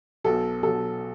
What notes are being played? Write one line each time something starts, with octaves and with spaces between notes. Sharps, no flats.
B1 B2 F#3 A4
B1 B2 F#3 A4